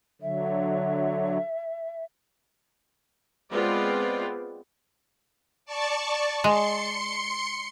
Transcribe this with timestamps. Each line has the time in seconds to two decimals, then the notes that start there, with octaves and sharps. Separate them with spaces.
0.21 D3 F#3 E5
3.51 G#3 B3 C4 F4 D5
5.65 D5 A5 C#6
6.44 G#3 C6 C#7